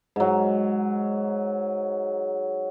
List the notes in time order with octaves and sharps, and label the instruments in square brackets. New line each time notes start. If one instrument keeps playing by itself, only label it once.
[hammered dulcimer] G#2 F#3